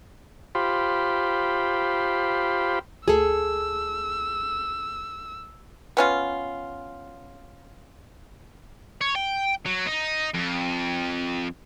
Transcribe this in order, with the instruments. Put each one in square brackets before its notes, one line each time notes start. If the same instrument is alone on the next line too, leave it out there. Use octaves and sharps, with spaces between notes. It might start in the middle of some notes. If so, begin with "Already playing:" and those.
[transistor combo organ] F4 G4 C5 B5
[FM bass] D2 [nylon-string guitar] G#4 A4 [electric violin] E6
[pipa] B3 C#4 F4
[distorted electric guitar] C#5
G5
F#3
D#4
F2